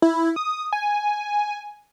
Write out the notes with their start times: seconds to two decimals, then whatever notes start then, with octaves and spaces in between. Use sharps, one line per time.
0.02 E4
0.36 D#6
0.73 G#5